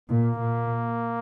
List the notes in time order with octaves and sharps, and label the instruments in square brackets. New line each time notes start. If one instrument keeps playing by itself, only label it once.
[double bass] A#2 [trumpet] A#3
[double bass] A#2